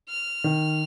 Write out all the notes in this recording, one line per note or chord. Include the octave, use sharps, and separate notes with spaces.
F6
D#3